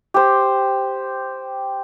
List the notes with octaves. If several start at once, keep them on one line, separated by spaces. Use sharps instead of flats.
G4 C5